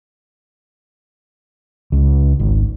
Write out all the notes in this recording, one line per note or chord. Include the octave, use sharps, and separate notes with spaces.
C#2
G#1